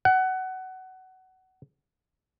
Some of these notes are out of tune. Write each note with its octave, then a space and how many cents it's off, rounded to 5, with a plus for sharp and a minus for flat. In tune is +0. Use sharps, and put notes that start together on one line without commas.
F#5 +20